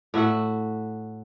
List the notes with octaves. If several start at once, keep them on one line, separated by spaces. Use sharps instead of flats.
A2 F#4 E5 F#5